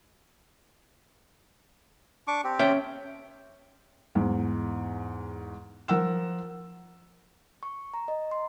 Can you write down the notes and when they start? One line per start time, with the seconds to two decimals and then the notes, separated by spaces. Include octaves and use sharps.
2.28 D4 C#6 D6
2.44 C4 G4
2.59 C#4 E5 G5
4.15 E2 G#2
5.88 F3 A#4 F#5 E6 E7
7.63 C#6
7.94 A#5
8.08 D#5
8.31 C6